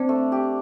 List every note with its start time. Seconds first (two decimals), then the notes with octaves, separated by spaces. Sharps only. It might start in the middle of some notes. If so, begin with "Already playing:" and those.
Already playing: C4 D4
0.09 A3
0.32 G4